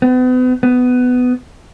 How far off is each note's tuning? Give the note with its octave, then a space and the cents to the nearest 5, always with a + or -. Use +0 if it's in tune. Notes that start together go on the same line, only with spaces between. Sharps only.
B3 +40
B3 +15